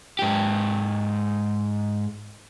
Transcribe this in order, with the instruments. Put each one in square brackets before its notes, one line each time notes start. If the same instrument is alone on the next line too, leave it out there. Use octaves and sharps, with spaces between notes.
[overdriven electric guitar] G#2 G4